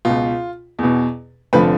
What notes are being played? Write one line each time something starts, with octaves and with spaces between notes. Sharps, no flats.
C#2 B2 F4
E2 B2
F1 D3 F3 B4